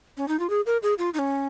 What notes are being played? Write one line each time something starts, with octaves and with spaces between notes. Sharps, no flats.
C#4
D#4
F4
G#4
A#4
G#4
F4
D#4
C#4